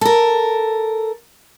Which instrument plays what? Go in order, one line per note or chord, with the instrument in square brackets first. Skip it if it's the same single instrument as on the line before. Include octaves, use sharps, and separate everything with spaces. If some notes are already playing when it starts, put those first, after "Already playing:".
[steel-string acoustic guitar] A4 A#4